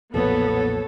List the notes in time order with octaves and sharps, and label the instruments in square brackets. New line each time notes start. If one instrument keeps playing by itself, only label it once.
[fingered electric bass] B1 F2 A#2 [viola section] B3 [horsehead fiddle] A4 C#5